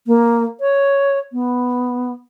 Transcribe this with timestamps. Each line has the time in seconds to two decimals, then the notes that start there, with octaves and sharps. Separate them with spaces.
0.07 A#3
0.61 C#5
1.33 B3